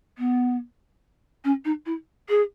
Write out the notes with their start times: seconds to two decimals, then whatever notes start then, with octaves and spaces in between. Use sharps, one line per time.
0.18 B3
1.44 C#4
1.65 D#4
1.86 E4
2.29 G#4